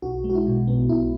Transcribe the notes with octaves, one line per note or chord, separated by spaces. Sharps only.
B1 F#4
G#3
F#4
E4
B2
B1 B3
B1 E4